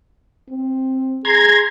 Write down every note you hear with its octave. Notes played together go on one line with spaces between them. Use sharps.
C4
G#4 A#5 C6 G#6